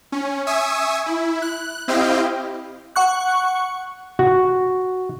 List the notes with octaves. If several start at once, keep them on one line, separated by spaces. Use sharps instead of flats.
C#4
E5 G#5 C#6 D#6 E6
E4
F#6
C4 E4 G4 D#5 F5 G5
F#5 C#6 F#6
F#4